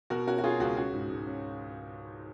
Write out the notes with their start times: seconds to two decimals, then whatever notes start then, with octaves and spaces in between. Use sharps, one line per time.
0.10 B2 F#4 A#4
0.27 C#4 F#4 A#4
0.38 F#4
0.44 C#4 F4 G#4
0.60 C#2 F#4
0.77 C#4 F#4
0.93 G#2
1.10 G#2
1.27 C#4